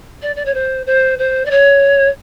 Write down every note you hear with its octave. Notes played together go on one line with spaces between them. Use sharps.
D5
D5
C#5
C5
C5
C5
D5
C#5